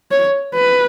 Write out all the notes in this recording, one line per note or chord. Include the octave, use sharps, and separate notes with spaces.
C#5
B4